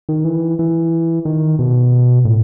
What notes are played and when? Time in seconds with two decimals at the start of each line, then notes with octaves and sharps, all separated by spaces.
0.09 D#3
0.24 E3
0.59 E3
1.25 D#3
1.59 B2
2.25 A2